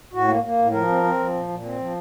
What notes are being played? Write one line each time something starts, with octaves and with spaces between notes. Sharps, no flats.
A2 F#4
A#3
A#3
A2
F3 A#4
C4
C4
F3
A#2
A#2
C4
F3